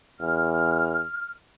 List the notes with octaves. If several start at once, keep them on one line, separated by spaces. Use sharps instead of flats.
E2 F6